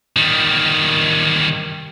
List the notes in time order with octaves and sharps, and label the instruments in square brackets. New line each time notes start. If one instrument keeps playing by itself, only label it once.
[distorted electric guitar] D#3 G3